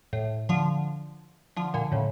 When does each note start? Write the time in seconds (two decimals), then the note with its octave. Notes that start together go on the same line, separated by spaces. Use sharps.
0.13 A2
0.49 D3 F3
1.56 D3 F3
1.74 A#2 D3
1.92 A2 C#3